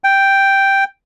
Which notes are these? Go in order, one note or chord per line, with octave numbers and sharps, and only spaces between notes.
G5